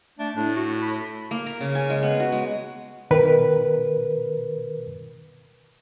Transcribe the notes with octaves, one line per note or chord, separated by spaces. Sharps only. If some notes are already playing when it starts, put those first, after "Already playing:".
A3 D4
A2 D4
F#4
B5
A#3
A#4
C#3
G#5
G#3
B3
F#4
G#3
B2 D#3 A#4 B4